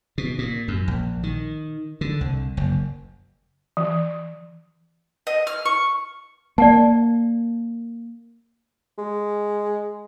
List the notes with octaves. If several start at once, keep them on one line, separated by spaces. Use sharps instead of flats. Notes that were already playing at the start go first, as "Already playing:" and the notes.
B2
A#2
F#2
A#1
D#3
D3
C2
F#1
E3
D#5
F6
C#6
A#3 D5 F#5 A5
G#3